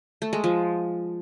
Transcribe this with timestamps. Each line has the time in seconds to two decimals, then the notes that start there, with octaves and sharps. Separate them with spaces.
0.22 A3
0.33 G#3
0.44 F3